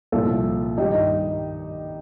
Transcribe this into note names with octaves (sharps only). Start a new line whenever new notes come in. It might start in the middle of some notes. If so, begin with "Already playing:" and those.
C2 A#2 F3 F4 A4
G2 D#3 D#4 G4